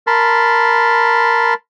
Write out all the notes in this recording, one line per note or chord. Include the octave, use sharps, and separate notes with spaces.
A#4 A5 B5 C6